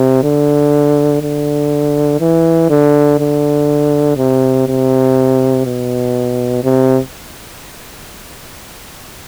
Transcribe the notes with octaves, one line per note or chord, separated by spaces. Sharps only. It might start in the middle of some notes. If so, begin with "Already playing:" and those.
Already playing: C3
D3
D3
E3
D3
D3
C3
C3
B2
C3